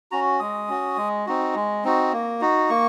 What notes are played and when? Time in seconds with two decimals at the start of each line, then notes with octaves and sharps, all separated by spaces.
0.12 C#4 F#4 A#5
0.40 G#3 D#6
0.68 C#4 F#4
0.97 G#3
1.26 C4 D#4 F#4
1.55 G#3
1.84 C4 D#4 F#4
2.13 A#3
2.41 D#4 F#4
2.70 A#3 C#6